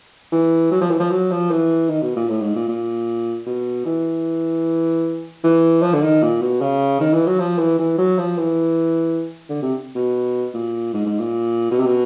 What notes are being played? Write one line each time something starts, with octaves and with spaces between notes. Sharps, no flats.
E3
F#3
F3
E3
F3
F#3
F3
E3
D#3
B2
A#2
A2
G#2
A#2
A#2
B2
E3
E3
F3
D3
D#3
A#2
B2
C#3
D#3
E3
F#3
F3
E3
E3
F#3
F3
E3
D3
C3
B2
A#2
G#2
G#2
A#2
B2
C3
B2